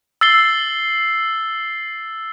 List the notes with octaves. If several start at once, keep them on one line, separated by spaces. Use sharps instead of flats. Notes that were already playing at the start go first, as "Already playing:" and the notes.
E6 A6 C7 G7